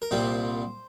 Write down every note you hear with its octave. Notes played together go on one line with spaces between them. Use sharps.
A#4
C2 A#2 G3 C4 C5